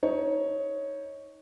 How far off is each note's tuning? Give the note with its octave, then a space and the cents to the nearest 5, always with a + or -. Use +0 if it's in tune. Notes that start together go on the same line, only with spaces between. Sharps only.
D#4 +25 C#5 +0